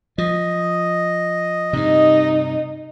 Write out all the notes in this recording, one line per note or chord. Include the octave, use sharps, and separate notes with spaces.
F3 D#5
G2 C3 D#4